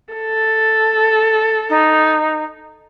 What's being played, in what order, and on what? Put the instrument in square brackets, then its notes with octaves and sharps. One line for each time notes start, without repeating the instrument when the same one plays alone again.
[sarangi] A4
[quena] D#4